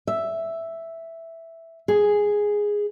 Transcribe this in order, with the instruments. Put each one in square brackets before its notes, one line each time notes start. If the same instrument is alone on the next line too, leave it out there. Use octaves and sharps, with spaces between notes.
[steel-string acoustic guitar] E5
G#4